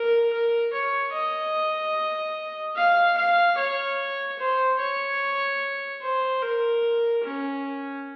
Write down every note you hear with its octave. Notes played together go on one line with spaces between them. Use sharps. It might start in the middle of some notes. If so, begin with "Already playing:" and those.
Already playing: A#4
A#4
C#5
D#5
F5
F5
C#5
C5
C#5
C5
A#4
C#4